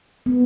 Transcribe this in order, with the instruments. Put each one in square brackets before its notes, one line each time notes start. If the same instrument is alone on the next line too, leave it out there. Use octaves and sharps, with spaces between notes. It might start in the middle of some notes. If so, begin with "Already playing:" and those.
[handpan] B3